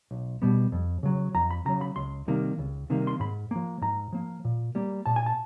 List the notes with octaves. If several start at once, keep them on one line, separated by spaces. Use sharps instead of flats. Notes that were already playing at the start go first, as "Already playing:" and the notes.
B1
B2 G3 B3
F2
C#3 F#3
F2 A#5
B5
C#3 F#3 A#5
B5
C#2 C6
C3 D#3 G3 A#3
C#2
C3 D#3 G3 A#3
C6
G#2 B5
F3 A#3
G#2 A#5
F3 A#3
A#2
G3 A#3
A#2 A5
G#5
A5